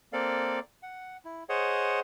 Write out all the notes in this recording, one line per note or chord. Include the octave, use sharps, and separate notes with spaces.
A#3 C4 A4 D5 F5
F#5
E4
G#4 C5 C#5 D#5 F#5